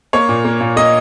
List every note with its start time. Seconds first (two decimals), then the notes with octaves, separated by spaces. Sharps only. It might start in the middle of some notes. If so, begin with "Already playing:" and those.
0.13 A#3 C#5
0.29 A#2
0.45 A#3
0.61 A#2
0.76 A#3 D#5